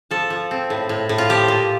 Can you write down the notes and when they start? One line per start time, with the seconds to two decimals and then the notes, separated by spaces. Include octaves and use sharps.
0.11 F3 A4
0.30 F3
0.51 C4
0.70 A2
0.89 A2
1.09 A2
1.18 F4
1.29 F3 G4
1.48 A#2